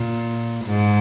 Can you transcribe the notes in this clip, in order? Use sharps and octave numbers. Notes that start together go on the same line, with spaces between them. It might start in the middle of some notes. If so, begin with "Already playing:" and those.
Already playing: A#2
G#2